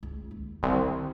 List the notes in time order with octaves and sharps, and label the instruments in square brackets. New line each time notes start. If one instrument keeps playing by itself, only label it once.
[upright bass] C#2
D#2
[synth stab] C2 [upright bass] D3 D#3